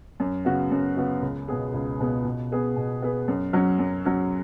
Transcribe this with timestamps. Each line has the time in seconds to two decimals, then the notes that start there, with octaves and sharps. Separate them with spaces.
0.20 F#2
0.45 C#3 B3 F#4
0.71 F#2
0.97 C#3 B3 F#4
1.22 C#2
1.48 B2 B3 G#4
1.74 C#2
2.00 B2 B3 G#4
2.25 B2
2.51 B3 G#4 B4
2.76 B2
3.02 B3 G#4 B4
3.28 F#2
3.53 F#3 C#4
3.79 F#2
4.05 F#3 C#4